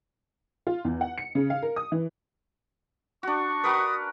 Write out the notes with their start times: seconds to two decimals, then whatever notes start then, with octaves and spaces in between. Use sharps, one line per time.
0.67 F4
0.85 E2
1.01 F#5
1.18 C#7
1.35 C#3
1.50 F5
1.62 A#4
1.76 D#6
1.92 E3
3.23 D4 F#4 C#6
3.64 F#4 A#4 B4 D#6